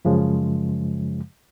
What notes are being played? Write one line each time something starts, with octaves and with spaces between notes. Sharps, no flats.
F#2 C#3 F3 G#3